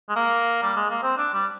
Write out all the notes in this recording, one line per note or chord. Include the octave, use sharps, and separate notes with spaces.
G#3
A#3
G3
G#3
A#3
C4
D4
G3